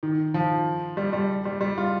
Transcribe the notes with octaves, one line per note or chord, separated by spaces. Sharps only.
D#3
F3
G3
G3
G3
G3
F4